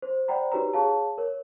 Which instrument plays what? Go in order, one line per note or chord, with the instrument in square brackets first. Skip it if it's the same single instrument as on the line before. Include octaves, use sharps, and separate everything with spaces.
[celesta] C5
C5 D5 F#5 G5 A#5 B5
D#4 F#4 G4 B4 C#5 A#5
G#4 C#5 F5 A5
A#4 C#5